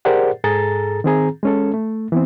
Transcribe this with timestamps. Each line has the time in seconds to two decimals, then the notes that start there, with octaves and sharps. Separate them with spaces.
0.05 G4 G#4 A#4 C5 D5 F#5
0.44 G#2 G#4 A4 A#5 A6
1.04 D#3 C4 G#4 A#5
1.43 G#3 C#4 A4
1.74 A3
2.12 E3 B3 C4